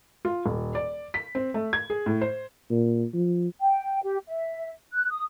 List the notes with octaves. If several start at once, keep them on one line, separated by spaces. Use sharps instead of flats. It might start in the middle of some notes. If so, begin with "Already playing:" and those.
F4
D#1
D5
B6
C4
A3
G#6
G#4
A2
C5
A#2
F3
G5
G4
E5
F#6
D#6